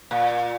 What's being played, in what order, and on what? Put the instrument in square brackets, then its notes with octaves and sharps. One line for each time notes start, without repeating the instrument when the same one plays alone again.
[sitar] A#2